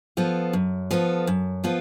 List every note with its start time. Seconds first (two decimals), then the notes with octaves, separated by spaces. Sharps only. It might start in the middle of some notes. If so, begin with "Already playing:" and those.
0.17 F3 B3 F4 A4
0.53 F#2
0.91 F3 B3 F4 A4
1.27 F#2
1.64 F3 B3 F4 A4